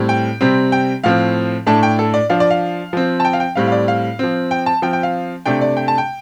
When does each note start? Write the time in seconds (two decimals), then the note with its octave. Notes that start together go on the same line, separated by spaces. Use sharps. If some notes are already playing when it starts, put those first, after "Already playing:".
Already playing: A2 G3 C4
0.09 G5
0.41 C3 G3 C4
0.72 G5
1.04 A2 F3 C4 F5
1.66 A2 A3 D4 A5
1.83 G5
1.99 A4
2.14 D5
2.30 F3 D4 F5
2.40 D5
2.50 F5
2.93 F3 C4
3.20 A5
3.25 G5
3.33 F5
3.40 G5
3.55 A2 G3 C4 F5
3.67 F5
3.72 D5
3.88 F5
4.19 F3 C4
4.51 G5
4.66 A5
4.82 F3 C4 G5
4.93 G5
5.03 F5
5.46 C3 A3 D4 G5
5.61 D5
5.77 G5
5.88 A5
5.98 G5